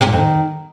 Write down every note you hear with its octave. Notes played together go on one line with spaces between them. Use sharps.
C3
A#2
F2
D#3